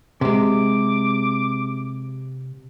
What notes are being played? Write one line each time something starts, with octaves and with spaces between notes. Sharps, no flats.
C3 G#3 D6